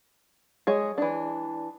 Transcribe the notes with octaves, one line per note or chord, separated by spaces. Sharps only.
G#3 G#4 C#5
E3 D4